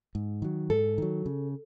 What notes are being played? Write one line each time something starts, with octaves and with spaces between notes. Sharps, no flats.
G#2
D#3 F#3
G#2 A4
D#3 F#3
C#3